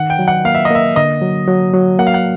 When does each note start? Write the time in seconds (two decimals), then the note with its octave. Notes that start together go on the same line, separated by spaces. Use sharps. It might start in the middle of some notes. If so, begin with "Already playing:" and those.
Already playing: D#3 F#5
0.10 G5
0.19 F#3
0.28 F#5
0.45 A#3 F5
0.55 E5
0.65 D#5
0.71 A#3 E5
0.96 D3 D#5
1.22 F#3
1.48 F#3
1.74 F#3
1.99 A#3 F#5
2.07 F5
2.14 F#5